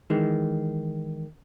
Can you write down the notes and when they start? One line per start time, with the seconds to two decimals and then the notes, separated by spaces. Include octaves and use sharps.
0.10 D#3 E3 G#3